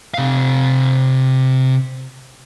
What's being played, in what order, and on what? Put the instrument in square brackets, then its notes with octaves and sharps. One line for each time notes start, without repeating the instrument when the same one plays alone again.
[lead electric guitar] C3 F5